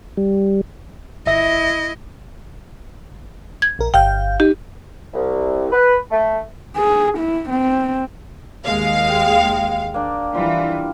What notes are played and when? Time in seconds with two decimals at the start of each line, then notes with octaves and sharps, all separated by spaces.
0.17 G3
1.26 G1 E4 D#5 E5 A#6
3.62 G#6
3.79 A#1 A#4
3.94 G1 F5 G5 G6
4.40 D#4 G4
5.13 C2
5.72 B4
6.11 A3
6.77 G#4
7.18 E4
7.50 C4
8.66 D#2 G#3 F5
9.09 G5
9.94 A#3 D4
10.34 E3 G3 F4